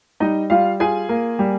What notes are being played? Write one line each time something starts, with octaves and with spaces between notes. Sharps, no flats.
G3 D#4 D#5
G3 F4 F5
F4 G#4 G#5
A#3
G3